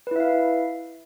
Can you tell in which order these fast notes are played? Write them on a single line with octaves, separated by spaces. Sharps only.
B4 E4 E5 F5